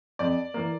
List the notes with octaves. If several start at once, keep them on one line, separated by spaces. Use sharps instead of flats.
F2 D5
E3 A#3